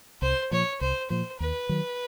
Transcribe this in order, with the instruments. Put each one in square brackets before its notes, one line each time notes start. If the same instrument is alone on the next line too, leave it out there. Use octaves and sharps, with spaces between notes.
[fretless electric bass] C2 [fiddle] C5
[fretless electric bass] A#2 F3 [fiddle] C#5
[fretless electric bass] C2 [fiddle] C5
[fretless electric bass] A#2 F3 [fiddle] C5
[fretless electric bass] D#2 [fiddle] B4
[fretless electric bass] D#3 F#3